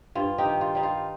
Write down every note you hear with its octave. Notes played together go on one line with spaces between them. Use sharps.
G2 F4
D#4 G4
D#3
F4
G3 D#4
F4